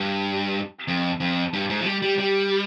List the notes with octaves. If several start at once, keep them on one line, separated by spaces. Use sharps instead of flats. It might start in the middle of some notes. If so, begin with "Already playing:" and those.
Already playing: G2
F2
F2
G2
G#2
F3
G3
G3
G3